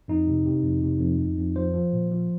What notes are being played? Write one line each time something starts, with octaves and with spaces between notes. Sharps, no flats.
F2 D#4
C3
C3
F2
C3
F2
F2
F2
F3 C5
F3
A#2
F3